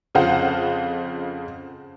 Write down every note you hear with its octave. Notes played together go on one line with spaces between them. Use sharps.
F2 C#3 F4 C5 F5 F#5